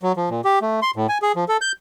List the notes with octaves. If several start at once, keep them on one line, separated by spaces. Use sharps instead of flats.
F#3
F3
A#2
G4
A3
C6
A2
G#5
G#4
F3
A4
G6